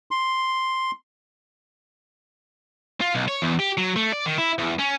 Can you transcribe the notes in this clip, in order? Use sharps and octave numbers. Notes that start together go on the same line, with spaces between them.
C6
F4
B1
C#5
E2
G4
F#3
A3
D5
D#3
E4
E2
C#4